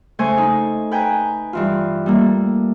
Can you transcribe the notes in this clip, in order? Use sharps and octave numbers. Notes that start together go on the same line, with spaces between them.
C#3 A3 C5 G#5 C#6
D#4
B4 G5 G#5 A#5
G2 E3 F4
G3 A3 A#3